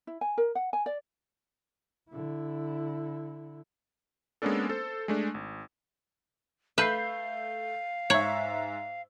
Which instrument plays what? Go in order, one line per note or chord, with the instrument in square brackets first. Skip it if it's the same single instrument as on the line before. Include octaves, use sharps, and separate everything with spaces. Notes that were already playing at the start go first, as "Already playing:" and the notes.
[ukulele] E4
G#5
A#4
F#5
G#5
D5
[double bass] D3 E4
[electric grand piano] G#3 A#3 B3 C#4 D4 A4
A4 C5
G#3 A3 D4
G#1
[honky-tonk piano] A3 G6 C7 [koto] B4 [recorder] F5
[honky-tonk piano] G#2 E5 [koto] C#5